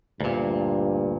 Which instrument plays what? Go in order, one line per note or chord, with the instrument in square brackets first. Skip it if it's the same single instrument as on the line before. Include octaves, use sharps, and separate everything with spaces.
[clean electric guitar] D2 A#2 [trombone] G2